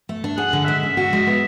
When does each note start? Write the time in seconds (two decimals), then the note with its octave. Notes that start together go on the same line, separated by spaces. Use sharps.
0.09 A3
0.24 D4
0.38 G#4 F#5
0.53 D3
0.68 G#3 E5
0.83 C#4
0.97 F#4
1.13 G#3
1.27 B3